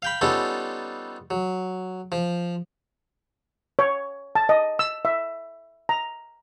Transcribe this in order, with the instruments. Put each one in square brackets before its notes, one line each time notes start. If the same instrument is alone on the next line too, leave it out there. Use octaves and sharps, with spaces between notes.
[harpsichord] F5 G5 B5
G3 B3 C#4 D#4 F4 A4
F#3
F3
[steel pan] C#5
A5
D#5
E6
E5
A#5